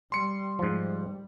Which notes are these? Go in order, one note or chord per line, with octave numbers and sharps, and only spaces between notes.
G3 C6 C#7
G#2 F3 G3